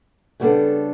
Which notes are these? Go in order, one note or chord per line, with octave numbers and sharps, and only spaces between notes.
C#3 G3 B3 D4 A4